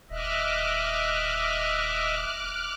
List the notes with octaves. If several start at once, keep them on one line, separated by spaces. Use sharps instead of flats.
D#1 D#5 E5 D6 F6 F#6